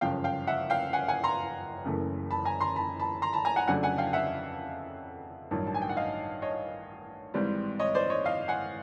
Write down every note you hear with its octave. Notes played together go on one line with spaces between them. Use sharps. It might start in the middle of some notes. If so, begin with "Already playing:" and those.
G1 F#2 C#3 F3 F5 G5
F5 G5
E5 F#5
F5 G5
F#5 G#5
F#5 G#5
A#5 C6
F#1 F#2 C#3 E3 A3
A5 B5
G#5 A#5
A#5 C6
A5 B5
A5 B5
A#5 C6
A5 B5
G#5 A#5
F#5 G#5
F2 C#3 F#3 A3 D4 F#5 G#5
F#5 G#5
F5 G5
E5 F#5
A1 G2 D#3 F#3
A5
G#5
G5
F#5
D#5 F5
C#5 D#5
G#1 G#2 E3 G3 C4
C#5 D#5
C5 D5
C#5 D#5
D#5 F5
F#5 G#5